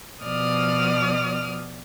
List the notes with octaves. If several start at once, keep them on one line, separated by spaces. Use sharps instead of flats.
B2 F3 D5 D#6 F6